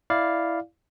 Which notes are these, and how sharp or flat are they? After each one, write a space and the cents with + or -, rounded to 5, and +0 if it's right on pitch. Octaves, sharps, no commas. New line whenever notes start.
E4 +0 D5 +0 F5 +0